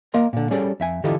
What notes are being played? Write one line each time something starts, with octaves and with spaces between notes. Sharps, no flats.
A#3 A#4 D#5 C6
A#2 D3
G3 C#4 G#4 A4 D5
F2 E5 G#5
D3 E3 F4 G4 A4 D#5